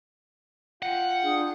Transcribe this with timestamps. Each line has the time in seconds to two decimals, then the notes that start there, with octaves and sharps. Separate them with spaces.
0.82 F4 F#5 G5
1.23 D4 G#4